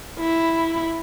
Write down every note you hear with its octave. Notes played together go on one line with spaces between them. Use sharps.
E4